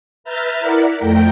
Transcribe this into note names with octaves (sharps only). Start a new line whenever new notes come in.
B4 E5 A#5 F6 G6 A6
E4 A#4 D5 F#5 B6
F2 A3 G5 A#5